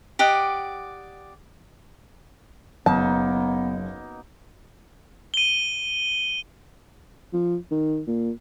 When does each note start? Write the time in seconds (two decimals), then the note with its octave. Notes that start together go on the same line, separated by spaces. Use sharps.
0.19 G4 D5 D#5 F#5
2.86 F#1 B2 A#3 B3 D#4 A5
5.34 D#7 G7
7.33 F3
7.70 D#3
8.07 A#2